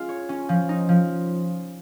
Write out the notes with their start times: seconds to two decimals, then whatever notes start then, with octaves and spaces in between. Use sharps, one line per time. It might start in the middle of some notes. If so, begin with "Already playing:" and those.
Already playing: G#3 C#4 F4
0.09 C#5
0.29 C#4
0.49 F3
0.69 D#4
0.89 F3